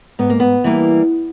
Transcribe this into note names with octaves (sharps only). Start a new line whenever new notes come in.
G#2 B3
A#3
B3
E3 G3 A#3